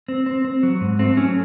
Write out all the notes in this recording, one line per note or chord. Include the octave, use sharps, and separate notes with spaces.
C4
C4
C4
F#3
G#2
A3 C4
F#3 C#4